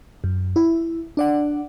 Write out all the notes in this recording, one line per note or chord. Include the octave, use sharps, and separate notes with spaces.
F#2
E4
D4 D5 F#5